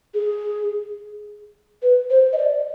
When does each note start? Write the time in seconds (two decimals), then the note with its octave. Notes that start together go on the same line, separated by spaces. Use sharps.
0.14 G#4
1.82 B4
2.10 C5
2.33 D#5
2.38 D5